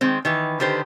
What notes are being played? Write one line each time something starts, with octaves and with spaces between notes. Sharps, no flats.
D#3 G#3 C4
D#3 E3 B4
D3 D#3 G4 B4 C5